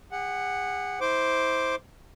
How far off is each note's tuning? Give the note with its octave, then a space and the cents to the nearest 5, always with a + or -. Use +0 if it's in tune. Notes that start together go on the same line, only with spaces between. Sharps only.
G#4 -45 F#5 +0
E4 -30 C5 +0 D6 -5